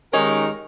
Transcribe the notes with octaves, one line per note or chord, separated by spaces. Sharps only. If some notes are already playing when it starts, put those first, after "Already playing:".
D#3 G#3 C#4 D#4 G4 A#4